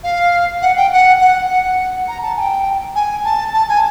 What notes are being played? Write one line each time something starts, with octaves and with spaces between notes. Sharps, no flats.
F5
F#5
G5
F#5
F#5
F#5
A#5
A5
G#5
G5
G#5
A5
A5
G#5